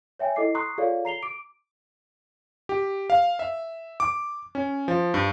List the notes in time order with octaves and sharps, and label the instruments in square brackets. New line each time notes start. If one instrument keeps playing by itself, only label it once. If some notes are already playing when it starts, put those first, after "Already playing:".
[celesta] C#5 E5 G5 G#5
E4 A4 D#5 D6 C7
A#5 C6 C#6 D#6 F#6 C7
F4 G#4 A4 C#5 D5 F5
A#5 C7 F7 G7
D6 D7
[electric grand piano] G4
F5
E5
D6
C#4
F3
G2